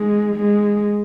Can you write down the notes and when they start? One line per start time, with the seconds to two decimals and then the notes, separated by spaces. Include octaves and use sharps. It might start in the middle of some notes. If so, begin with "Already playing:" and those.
Already playing: G#3
0.36 G#3